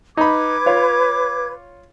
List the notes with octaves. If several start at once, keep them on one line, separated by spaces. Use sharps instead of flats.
D#4 B4 B5 D6 G#6
F4 C#5